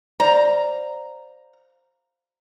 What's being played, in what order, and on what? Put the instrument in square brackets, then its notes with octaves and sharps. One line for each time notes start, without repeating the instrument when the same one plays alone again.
[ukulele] C5 D5 F5 [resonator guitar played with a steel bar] A#5